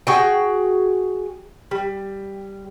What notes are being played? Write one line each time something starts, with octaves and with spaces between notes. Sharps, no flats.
F#4 G#4 G5
G3